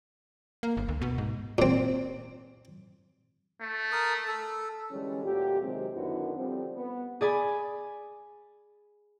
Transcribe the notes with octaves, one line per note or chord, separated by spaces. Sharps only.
A#3
G1
D2
B2
G#2
A#2 C4
A3
A#4 D#6
A4
D3 E3 G3 G#3 C#4
D2 A#2 F#4 G4
C3 D#3 F#3 G#3 C4
F#2 D3 D#3 B3 E4 F#4
D3 F3 G3 C4
B3
G#4 D5 G#5 B5